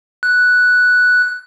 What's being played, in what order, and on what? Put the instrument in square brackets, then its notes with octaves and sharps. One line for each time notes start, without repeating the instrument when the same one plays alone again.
[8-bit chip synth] F#6